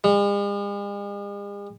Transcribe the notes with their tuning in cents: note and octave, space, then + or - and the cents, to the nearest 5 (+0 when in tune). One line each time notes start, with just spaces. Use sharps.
G#3 -45